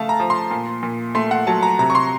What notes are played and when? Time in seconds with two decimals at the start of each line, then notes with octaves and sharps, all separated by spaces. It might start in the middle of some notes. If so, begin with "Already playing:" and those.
Already playing: C#3 A3 F5 A5
0.09 A#5
0.20 F3
0.30 C6
0.51 A#2
0.83 A#2
1.15 A3 C6
1.31 F#5
1.47 F#3 A5
1.63 A#5
1.79 C3 A#5
1.90 C#6
1.95 C6